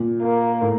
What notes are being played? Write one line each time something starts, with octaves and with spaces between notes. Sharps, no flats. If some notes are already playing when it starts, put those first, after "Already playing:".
Already playing: A#2
A#3
A2